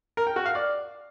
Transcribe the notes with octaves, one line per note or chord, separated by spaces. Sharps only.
A#4
G5
F#4
F5
D5